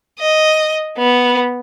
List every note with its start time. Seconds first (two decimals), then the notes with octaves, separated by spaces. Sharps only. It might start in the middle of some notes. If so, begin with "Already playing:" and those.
0.19 D#5
0.98 B3